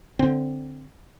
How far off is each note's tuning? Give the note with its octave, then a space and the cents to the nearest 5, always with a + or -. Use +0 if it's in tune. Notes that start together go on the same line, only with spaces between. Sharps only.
D3 +0 C4 +0